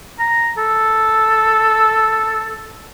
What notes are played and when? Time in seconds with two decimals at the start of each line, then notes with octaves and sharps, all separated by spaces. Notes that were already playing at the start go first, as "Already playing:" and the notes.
0.19 A#5
0.58 A4